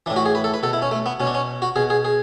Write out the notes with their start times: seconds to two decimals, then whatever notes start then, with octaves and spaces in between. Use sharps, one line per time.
0.06 E3 D4
0.10 A2
0.16 F#4
0.26 G#4
0.35 B4
0.44 A4
0.54 B4
0.63 B2 A4
0.73 E4
0.82 C#4
0.91 A3
1.06 B3
1.20 B2 C#4
1.27 D4
1.34 C#4
1.62 F#4
1.76 B2 G#4
1.90 G#4
2.05 G#4